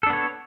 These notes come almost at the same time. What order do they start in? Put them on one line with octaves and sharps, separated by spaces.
A4 D4 B3 C#5